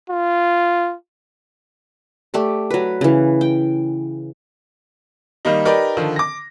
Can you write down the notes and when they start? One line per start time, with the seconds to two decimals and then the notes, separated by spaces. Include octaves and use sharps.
0.10 F4
2.34 A3 G4 D5
2.71 F#3 B4
3.01 C#3 E3
3.41 G5
5.45 D#3 G3 A#3 D#4
5.65 D#4 G4 A#4 B4 D5 D#5
5.97 D3 D#3 F3
6.16 D6 A#6